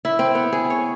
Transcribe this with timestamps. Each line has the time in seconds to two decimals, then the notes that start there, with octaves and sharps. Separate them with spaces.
0.05 E4
0.19 C4
0.35 B3
0.53 G#4
0.70 C#5